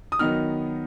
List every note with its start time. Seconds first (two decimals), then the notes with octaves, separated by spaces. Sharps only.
0.12 D#6
0.19 D#3 F#3 B3 D#4 F6